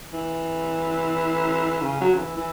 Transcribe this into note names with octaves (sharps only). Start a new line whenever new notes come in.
E3
C#3
F#3
C#3
E3
E3